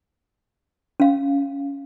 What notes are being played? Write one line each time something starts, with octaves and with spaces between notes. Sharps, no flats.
C#4 F5